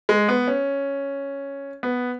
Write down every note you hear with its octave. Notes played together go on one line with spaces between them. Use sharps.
G#3
B3
C#4
B3